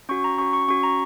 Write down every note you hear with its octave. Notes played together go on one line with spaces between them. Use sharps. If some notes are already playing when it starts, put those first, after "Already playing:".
C#4 F#4 C#6
A#5
C#4 F#4 C#6
C#6
C#4 F#4 C#6
A#5